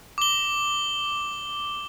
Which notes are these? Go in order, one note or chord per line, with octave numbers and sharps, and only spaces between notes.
D6 G7